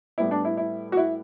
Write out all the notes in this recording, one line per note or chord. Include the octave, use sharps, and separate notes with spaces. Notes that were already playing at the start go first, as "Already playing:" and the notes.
A2 G3 B3 E4
D4
E4
E4
F#4
E4